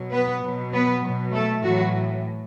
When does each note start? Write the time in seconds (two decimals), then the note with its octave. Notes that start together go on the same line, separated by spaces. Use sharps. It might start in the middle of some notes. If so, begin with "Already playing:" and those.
Already playing: B2 F#3
0.13 B3 B4
0.43 B2 F#3
0.73 B3 B4
1.03 B2 F#3
1.34 A3 A4
1.64 A2 E3 F#3 F#4